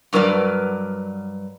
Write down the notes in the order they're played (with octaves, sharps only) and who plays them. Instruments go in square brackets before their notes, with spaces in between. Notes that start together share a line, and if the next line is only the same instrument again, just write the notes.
[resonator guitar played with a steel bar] G2 F#3 A#4 B4 D5